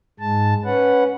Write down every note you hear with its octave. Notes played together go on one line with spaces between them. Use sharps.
G#2 G#3 A5
C#4 B4 F#5